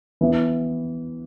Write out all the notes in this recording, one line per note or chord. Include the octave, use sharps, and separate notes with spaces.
E3 B3 E4